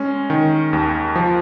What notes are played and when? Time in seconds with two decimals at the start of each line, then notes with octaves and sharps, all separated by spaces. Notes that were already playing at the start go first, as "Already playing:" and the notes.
Already playing: G#3 C#4
0.30 D#3
0.73 D#2
1.16 F3